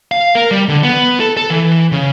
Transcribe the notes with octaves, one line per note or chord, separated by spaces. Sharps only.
F5
A#4
G3
D3
B3
A4
A4
E3
C#3